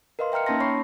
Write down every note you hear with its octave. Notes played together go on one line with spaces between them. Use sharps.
A#4 B4 D#5 F5 C6
E5 G5 A#5 F6 C#7
A#3 C#4 D#4 A5 C6 A#6
C#4 C#5 B5 C#6 C7